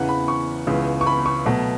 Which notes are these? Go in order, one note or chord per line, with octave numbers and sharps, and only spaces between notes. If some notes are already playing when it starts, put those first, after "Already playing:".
Already playing: E2 C#3 E3 F#5
B5
C#6
C#2 C#3 E3 B3
C#6
B5
C#6
B2 F#3 A3